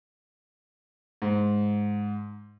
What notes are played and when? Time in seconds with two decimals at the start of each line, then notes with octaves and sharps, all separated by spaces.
1.22 G#2